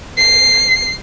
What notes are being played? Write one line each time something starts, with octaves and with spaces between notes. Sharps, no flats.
C7